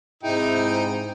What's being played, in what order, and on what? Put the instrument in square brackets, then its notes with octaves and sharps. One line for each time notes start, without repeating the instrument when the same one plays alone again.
[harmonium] G#2 C3 G5 [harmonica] D#4 [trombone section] E4 G#4